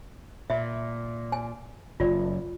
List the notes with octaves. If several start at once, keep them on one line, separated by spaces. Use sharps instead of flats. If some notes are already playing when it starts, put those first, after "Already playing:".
A#2 E5 B5
G#5
F#1 F4 D5